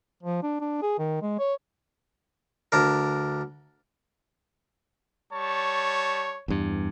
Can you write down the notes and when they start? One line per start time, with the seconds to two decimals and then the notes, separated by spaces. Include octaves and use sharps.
0.23 F3
0.43 D4
0.61 D4
0.82 G#4
0.98 D#3
1.22 G#3
1.39 C#5
2.72 D2 D4 A#4
5.33 G3 C#5 A5 C#6
6.48 E2 G2